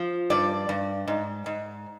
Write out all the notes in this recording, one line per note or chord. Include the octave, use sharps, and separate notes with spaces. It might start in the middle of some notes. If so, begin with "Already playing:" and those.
Already playing: F3
G2 D5
G2
G#2
G#2